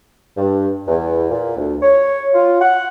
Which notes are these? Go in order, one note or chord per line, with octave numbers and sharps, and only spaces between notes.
G2
E2
A#2
D2
C#5
F4
F#5